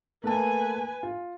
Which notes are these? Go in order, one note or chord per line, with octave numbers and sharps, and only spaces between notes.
A3 A#3 B4 G#5 A5
F4